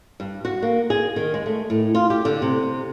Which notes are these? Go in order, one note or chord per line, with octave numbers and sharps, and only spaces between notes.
G2
F#4
A#3
G#4
D#3
G#3
A3
A2
F4
G4
D3
C3